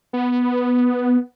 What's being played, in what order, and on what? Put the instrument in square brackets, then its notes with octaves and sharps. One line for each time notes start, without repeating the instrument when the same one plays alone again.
[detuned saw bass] B3